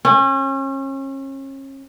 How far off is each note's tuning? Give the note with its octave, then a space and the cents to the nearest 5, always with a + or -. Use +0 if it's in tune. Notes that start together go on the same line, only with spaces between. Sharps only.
C#4 -35